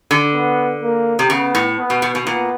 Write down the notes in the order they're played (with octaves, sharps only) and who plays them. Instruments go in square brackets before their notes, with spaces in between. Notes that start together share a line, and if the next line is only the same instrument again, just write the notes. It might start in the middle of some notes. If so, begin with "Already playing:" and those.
[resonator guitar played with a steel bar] D3
[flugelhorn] B3
A#3
[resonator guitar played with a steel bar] C3
[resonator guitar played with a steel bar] C#3 [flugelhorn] B3
[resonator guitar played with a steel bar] A2
[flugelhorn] B3
[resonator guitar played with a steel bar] B2
B2
B2
[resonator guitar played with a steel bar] A#2 [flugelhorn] B3